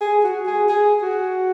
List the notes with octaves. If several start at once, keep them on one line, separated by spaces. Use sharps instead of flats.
G#4
F#4
G#4
G#4
F#4